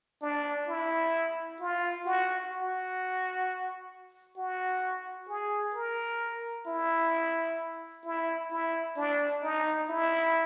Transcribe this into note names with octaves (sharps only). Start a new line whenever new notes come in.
D4
E4
F4
F#4
F#4
F#4
G#4
A#4
E4
E4
E4
D4
D#4
E4